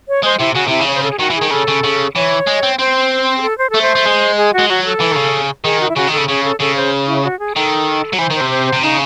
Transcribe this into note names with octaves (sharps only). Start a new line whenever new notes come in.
C#5
G#3 C5
C3 E4
C#3 F#4
C3 E4
C#3
C#5
C5
A4
G#4
D#3 F#4
E3
G#4
D#3
C#3 A4
C#3
C#3
E3 C#5
G#3
C4
C4 C5
G#4
A4
C5
A3 A4
C5
A3
G#3
G#4
F#4
G#3
F#3 F#4
A4
E3
D#3
C#3
D#3 G#4
F#4
E4
C#3 F#4
D#3 A4
C#3
C#3 G#4
A4
C#3 A4
C5
E4
F#4
G#4
D#3 A4
F#3
E3 C5
D#3
C5
C3
C5
C5
C3
C#3 D#4